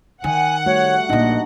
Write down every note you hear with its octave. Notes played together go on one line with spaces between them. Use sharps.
D#3 F#5 G#5
G3 A3 F#4 C#5
A#1 A#2 D4 D#4 D#5